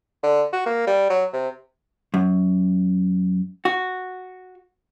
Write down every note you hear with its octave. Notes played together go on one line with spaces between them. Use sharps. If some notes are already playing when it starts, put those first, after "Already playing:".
D3
F#4
A#3
G3
F#3
C3
F#2
F#4